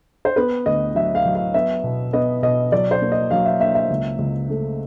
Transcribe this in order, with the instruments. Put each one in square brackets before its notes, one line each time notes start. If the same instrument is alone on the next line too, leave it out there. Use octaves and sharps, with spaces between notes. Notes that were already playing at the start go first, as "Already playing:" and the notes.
[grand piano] C5
B3 B4
D2 D#5
F#3 E5
F5
F#3
F5
B3 E5
B2
B3 D#5
B2 D#5
F#3 D5
C5
A#3
D#5
F#3 F5
E5
A#3 E5
E5
C#2
C#2
A3